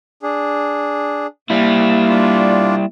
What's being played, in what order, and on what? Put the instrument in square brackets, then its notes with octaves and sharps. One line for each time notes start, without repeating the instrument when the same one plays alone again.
[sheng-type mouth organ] D4 G#4
[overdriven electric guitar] G3 E4 [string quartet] A#3 [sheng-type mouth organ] F5
[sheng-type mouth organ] D4 F4 D5